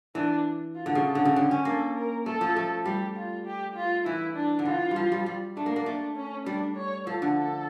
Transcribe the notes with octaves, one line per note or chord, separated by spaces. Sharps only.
E3 D4
F4
D3
C#3
A4
D3
C#3
D3 G4
C#4
A#3 A4
A#4
A3 A4
F3
A3
G3 G4
F4
G4
F4
E3 E4
D4
D3
E3 F4
G3
F3
G3
G3
A3 D4
A#3
A#3
A3 D4
C#4
G3 D4
C#5
F3 A4
D3
A4